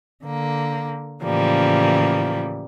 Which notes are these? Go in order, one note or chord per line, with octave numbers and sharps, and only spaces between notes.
D3 A#3
A2 C#3 E3 F3 G3 A#3